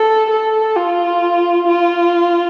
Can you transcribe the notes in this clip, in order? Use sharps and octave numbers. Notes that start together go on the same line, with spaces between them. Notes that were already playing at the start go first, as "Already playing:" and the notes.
Already playing: A4
A4
F4
F4